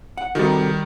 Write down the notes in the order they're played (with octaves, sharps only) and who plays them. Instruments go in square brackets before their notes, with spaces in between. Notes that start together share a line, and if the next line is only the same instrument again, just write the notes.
[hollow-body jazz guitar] F#5
[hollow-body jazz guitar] C3 F#4 A4 [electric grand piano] D#3 G3